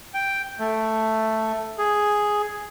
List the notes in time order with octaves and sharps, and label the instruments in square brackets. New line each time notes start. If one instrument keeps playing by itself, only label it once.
[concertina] G5
A3
G#4